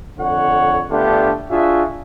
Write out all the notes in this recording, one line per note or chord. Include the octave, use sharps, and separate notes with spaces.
F2 D3 C#5 F#5
D3 A3 B3 D4 F4 G4
D4 F4 F#4 G#4 E5